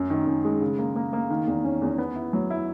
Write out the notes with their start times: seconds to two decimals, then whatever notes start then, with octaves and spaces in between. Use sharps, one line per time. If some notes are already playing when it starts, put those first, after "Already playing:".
Already playing: F#2
0.10 D#3
0.27 F#2
0.44 G#3
0.61 C#3
0.79 A#3
0.96 A#3
1.13 A#3
1.30 D#3
1.47 E2
1.64 C#4
1.82 E2
1.98 B3
2.16 E4
2.33 F#3
2.50 E4